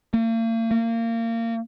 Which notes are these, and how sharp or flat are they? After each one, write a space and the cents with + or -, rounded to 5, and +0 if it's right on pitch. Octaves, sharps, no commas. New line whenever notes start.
A#3 -45
A#3 -25